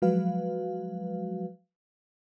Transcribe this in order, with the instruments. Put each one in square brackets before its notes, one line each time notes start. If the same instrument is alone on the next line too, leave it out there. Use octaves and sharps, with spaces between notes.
[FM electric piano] F3 F#3 G#3 F#4 B4 F5